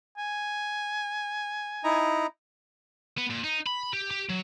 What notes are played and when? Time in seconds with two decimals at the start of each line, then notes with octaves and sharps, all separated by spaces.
0.17 G#5
1.84 D#4 E4 A#5
3.18 B3
3.31 A#2
3.44 D#4
3.67 B5
3.93 G4
4.10 G4
4.29 F#3